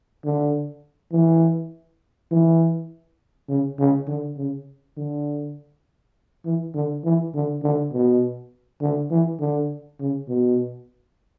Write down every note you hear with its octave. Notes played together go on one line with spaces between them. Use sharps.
D3
E3
E3
C#3
C#3
D3
C#3
D3
E3
D3
E3
D3
D3
B2
D3
E3
D3
C#3
B2